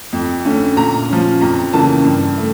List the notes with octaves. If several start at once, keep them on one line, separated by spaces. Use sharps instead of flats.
F2
D3 A3 C#4
A#2 A#5
F3 C#4
F2 A#5
C#3 E3 A#3 C#4 A5
G2
A3